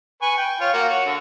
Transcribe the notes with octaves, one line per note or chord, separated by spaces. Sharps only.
B4 G#5 C#6
G5
F4 C#5
A#3 F#4
F#4 C#5
D3